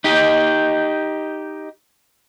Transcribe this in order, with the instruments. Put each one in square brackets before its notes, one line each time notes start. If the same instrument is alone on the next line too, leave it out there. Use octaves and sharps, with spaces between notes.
[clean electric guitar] D#4 G4 D#5